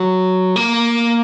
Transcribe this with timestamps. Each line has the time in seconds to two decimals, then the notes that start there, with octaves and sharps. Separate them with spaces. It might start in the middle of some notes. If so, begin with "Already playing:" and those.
Already playing: F#3
0.56 A#3